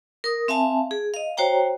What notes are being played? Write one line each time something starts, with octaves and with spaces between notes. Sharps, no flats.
A#4 D#6
C4 E5 F5 G#5 A5
G#4
D#5 F5
F#4 C5 C#5 G5 A#5